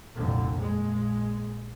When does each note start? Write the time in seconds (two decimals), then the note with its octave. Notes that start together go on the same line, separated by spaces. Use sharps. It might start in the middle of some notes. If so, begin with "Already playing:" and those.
0.16 G1 C2 F2 A#2 D3
0.63 A#1 G#3